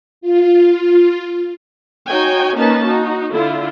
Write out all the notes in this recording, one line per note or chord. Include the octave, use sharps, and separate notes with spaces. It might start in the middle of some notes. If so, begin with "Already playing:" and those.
F4
D#4 F#4 C#5 G5 G#5
A#3 C#4 D#4 B4 A5
D#4 F#4
D3 E4 F4